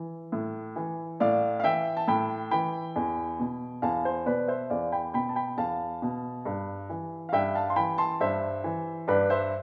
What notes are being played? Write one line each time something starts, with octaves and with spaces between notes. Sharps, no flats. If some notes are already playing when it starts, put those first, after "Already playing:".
Already playing: E3
A2
E3
A2 D5 F5
F5
E3 E5 G5
A5
A2 G5 B5
E3 G5 B5
E2
B2
E2 F5 A5
C5
B2 B4 D5
C5 E5
E2 D5 F5
G5 B5
B2 G5 B5
A5
G5 B5
E2 F5 A5
B2
G2
E3
F5
G2 E5 G5
F5 A5
C6
E3 G5 B5
A5 C6
G2 C5 E5
E3
G2 B4 D5
C5 E5